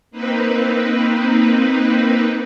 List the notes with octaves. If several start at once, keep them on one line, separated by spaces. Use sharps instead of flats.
A#3 C4 D#4 B4